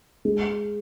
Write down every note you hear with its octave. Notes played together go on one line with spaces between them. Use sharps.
G#3